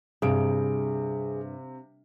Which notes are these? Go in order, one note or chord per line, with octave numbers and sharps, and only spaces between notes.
G2 C3 G#4 F5 D7